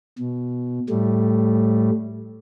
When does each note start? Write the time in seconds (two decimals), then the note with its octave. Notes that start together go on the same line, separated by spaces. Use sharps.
0.19 B2
0.89 A2 G3 A3